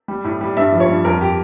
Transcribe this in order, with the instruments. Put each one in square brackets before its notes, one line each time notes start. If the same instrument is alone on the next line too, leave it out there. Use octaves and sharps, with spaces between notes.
[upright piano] G3
A2
G3
G2 E5
F3
C#5
G2
F2 A#4
G4